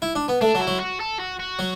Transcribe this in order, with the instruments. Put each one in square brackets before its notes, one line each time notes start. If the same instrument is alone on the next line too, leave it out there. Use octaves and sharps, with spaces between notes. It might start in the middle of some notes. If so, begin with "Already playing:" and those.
[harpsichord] E4
D4
B3
[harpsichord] A3 [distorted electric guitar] D4
[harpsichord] F#3
[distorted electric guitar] E4
[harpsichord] F#3
[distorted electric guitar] F#4
A4
F#4
F#4
[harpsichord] F#3